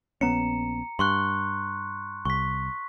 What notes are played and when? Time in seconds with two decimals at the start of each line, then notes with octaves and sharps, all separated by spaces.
0.21 A#1 B3 C#4 A#5 C#7
0.99 G2 C6 C#6 F#6
2.25 C2 C#6 B6